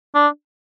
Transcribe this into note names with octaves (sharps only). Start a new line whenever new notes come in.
D4